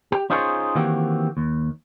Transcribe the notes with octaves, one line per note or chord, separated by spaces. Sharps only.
G4
C#4 D#4 F4 G#4 C5 C#5
D#3 E3 A#3 C4 F#4 G4
D#2